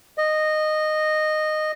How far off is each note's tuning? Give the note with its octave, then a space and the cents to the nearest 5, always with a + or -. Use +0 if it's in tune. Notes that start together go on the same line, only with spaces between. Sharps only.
D#5 -15